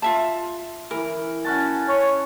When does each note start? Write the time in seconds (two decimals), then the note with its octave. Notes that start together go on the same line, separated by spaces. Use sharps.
0.02 F4 E5 A5
0.91 E3 A#4
1.45 C#4 F#4 A5
1.89 C#5